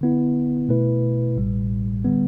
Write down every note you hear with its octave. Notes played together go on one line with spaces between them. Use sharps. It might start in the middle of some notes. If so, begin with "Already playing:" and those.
D3 B3 E4
B2 A3 E4 B4
A1 A2 G3
D3 G3 B3